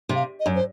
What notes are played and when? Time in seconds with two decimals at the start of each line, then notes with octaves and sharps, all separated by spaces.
0.09 C3
0.15 F5
0.40 D#5
0.46 F#2
0.56 C5